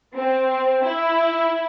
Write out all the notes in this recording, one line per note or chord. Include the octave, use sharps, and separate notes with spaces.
C4
E4